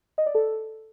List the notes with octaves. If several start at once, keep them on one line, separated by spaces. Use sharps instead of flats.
D#5
D5
A4